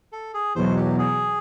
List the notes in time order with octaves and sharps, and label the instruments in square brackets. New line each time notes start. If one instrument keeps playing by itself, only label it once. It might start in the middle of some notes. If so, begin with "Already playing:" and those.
[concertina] A4
G#4
[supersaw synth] E2 B2 F#3 [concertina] C5
[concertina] G4
G#4